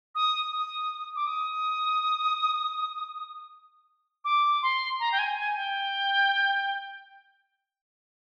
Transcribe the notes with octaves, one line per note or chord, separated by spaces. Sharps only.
D#6
D#6
D6
D#6
D6
C6
A#5
G5
G#5
G#5
G5